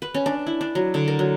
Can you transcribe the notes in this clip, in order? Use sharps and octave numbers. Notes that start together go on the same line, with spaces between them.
B4
C#4
D4
E4
D4
F#3
D3
A#4
F#3